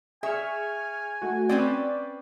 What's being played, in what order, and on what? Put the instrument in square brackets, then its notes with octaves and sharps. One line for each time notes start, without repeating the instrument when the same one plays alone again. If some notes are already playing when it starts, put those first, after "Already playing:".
[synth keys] G#4 C#6 F6 [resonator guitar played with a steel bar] E5 [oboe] G#5
[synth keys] A3 F#4
[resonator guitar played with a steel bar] C4 C#4 B4 [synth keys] D5